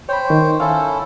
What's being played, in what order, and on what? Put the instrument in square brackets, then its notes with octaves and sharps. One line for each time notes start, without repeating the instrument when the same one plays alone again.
[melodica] C5 G5 [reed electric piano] C#5 B5
[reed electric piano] D#3 C#6
[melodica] C#4 E4 A4 [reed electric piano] F5